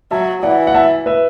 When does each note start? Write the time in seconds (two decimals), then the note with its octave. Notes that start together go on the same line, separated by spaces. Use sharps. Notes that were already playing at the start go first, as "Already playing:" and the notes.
0.11 F#3 E5 A5
0.43 E3 D5 F#5
0.67 F#5
0.74 E5 A5
1.06 B4 E5